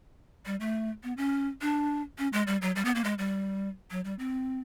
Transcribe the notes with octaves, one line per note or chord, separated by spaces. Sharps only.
G3
A3
B3
C#4
D4
C#4
G#3
G3
F#3
G3
B3
A#3
G#3
G3
F#3
G3
C4